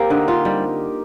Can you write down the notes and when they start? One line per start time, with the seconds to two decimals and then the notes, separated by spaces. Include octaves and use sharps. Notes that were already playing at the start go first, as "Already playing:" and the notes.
Already playing: A#3 C4 G4 A#4
0.10 D3 D#4
0.28 D#4 F4
0.45 G3 D#4